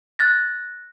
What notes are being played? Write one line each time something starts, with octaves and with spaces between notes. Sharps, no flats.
F#6 A6 A#6